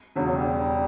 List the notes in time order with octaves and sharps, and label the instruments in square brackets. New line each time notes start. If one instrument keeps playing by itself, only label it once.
[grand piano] E1 E2 C#3 [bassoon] F#3
[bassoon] F#3
G3